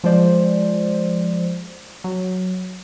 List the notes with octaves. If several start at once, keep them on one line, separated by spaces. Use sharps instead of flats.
F3 G#3 C5 D5
F#3